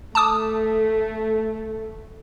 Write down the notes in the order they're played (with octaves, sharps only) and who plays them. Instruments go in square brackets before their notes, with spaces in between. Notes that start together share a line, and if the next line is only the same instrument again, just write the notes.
[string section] A3 [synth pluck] A5 D6 D#6